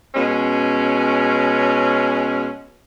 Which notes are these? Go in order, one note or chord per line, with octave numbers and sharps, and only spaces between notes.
B2 G#3 C#4